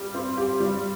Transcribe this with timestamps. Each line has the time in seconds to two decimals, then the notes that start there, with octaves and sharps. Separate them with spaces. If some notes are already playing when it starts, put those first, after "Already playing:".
Already playing: G3 G4
0.15 C4
0.38 G4
0.60 G3